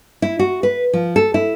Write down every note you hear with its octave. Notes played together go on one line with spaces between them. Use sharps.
E4
F#4
B4
F3
A4
E4